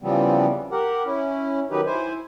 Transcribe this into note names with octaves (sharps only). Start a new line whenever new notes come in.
C#3 E3 F3 G3 B3 C4
G4 A#4 F#5
C#4 E4
D#3 F#3 D#4 G4 B4
E4 C5 G#5